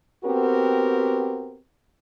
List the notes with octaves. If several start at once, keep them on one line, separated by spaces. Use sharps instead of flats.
B3 C4 F#4 G4 A#4